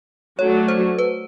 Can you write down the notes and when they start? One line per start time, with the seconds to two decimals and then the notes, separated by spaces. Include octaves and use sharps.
0.38 F#3 A3 D4 C#5
0.68 C5
0.99 B4